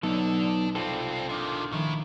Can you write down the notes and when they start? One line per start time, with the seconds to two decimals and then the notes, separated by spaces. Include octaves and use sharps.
0.03 B1 F#3 B3 D4 D#4 A4
0.75 C2 C4 F4 A4 D5
1.29 C3 D#3 D4 D#5
1.72 A2 D#3 F3 E4